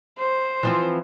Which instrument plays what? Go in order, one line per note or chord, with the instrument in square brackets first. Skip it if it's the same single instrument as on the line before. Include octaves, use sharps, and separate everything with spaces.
[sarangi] C5
[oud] E3 F3 C4